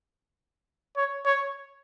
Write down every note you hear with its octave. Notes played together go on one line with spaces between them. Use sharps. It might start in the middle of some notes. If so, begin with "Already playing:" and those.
C#5
C#5